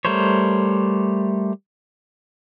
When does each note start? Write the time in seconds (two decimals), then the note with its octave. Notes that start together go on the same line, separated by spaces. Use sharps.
0.05 G3 A3 A#4 C5 C#5